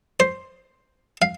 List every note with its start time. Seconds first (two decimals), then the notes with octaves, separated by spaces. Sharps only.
0.20 C5
1.22 F5